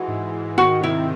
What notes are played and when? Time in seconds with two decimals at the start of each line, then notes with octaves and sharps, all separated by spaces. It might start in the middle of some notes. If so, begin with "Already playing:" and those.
Already playing: E3 G#3 F#4
0.08 G#2
0.34 G#2
0.58 D#3 F#4
0.83 C3 E4